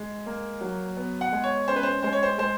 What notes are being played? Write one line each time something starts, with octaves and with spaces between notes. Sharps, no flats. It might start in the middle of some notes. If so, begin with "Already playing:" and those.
Already playing: G#3
A#3
F#3
B3
F#5
G#3
C#5
C#4 C5
B4
C5
G#3 C5
C#5
C5
G#3 C5